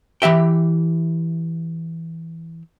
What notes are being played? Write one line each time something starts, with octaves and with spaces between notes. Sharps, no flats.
E3 G4 E5 G5